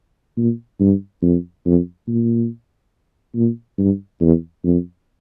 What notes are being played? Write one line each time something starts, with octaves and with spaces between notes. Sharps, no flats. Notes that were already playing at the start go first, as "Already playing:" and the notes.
A#2
G2
F2
F2
A#2
A#2
G2
E2
F2